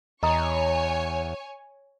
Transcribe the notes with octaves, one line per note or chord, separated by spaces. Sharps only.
E2 C#5 D#5 G#5 A#5 C#6 D#6